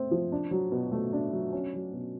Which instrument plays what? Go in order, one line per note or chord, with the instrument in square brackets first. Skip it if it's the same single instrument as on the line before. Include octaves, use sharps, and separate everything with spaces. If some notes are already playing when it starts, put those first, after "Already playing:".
Already playing: [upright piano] A3 C4
F3
D4
F#3
B2
A3
D4
F#3
C#4
F#3
B2